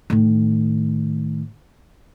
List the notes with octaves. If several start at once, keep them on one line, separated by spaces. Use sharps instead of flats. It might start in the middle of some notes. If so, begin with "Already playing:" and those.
A2 D#3